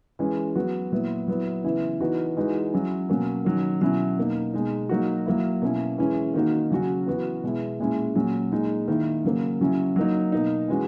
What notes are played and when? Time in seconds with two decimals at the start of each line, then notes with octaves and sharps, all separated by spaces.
0.19 E3 G#3 C#4
0.55 F#3 B3 F#4
0.91 A#2 F#3 B3 E4
1.28 F#3 B3 E4
1.64 C#3 E3 B3 E4
2.00 E3 B3 D#4 F#4
2.37 E3 G#3 D#4 F#4
2.73 F#3 C#4 E4
3.09 B2 F#3 A#3 C#4
3.45 D#3 F#3 C#4
3.81 B2 F#3 C#4 E4
4.18 B2 A#3 D#4
4.54 B2 G#3 D#4
4.89 F#3 A#3 D#4 F#4
5.26 F#3 A#3 E4
5.62 B2 A#3 C#4 E4
5.98 E3 G#3 C#4 E4
6.34 D#3 A#3 D#4 F#4
6.71 C#3 F#3 C#4 F#4
7.06 E3 B3 F#4
7.43 B2 G#3 B3 E4
7.80 A#2 G#3 C#4 E4
8.15 A#2 F#3 C#4
8.52 A#2 G#3 D#4
8.88 D#3 A#3 E4
9.24 C#3 F#3 A#3
9.60 C#3 F#3 C#4 E4
9.96 F#3 A#3 D#4
10.32 B2 A#3 D#4
10.68 E3 G#3 C#4 F#4